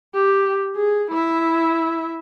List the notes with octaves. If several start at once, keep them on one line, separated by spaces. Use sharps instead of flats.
G4
G#4
E4 E5